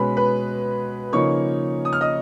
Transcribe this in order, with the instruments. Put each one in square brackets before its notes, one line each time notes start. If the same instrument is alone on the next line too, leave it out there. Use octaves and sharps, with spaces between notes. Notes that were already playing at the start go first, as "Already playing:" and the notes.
Already playing: [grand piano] B2 G#3 C#4 B4 B5
B4 B5
C#3 F3 A#3 D#4 C#5 C#6
D#6
F6
D#5 D#6